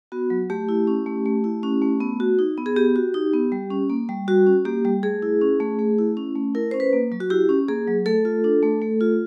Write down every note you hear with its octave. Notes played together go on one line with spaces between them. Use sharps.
B3 F#4
F#3
A3 G4
E4
C#4
A3
A3
E4
C#4
A3
B3
F#4
D#4
B3
G#4
B3 G4
F#4
D#4
B3
G3
C#4
A#3
G3
G3 F#4
C#4
A#3 G4
G3
A3 G#4
E4
C#4
A3
A3
E4
C#4
A3
E4 A#4
C#4 C5
B4
A#3
F#3
F#4
E4 G4
C#4
A#3 G#4
F#3
A3 A4
F4
D4
A3
A3
F4